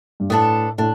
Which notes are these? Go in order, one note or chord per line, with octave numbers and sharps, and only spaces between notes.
G2
A2 B3 D4 A4
A2 D4